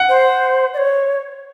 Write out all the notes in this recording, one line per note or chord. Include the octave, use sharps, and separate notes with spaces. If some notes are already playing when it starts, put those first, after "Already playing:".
Already playing: F#5
C5
D5
C#5